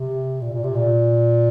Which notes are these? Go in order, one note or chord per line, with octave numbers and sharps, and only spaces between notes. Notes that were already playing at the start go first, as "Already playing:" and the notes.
Already playing: C3
A#2
A#2
C3
A#2